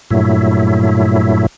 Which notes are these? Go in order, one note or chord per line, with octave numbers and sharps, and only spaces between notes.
G2 A#2 F#3 A3 E4